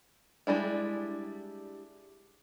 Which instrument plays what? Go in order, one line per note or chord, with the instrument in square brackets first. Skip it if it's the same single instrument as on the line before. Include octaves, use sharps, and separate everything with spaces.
[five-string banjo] G3 G#3 D4 E4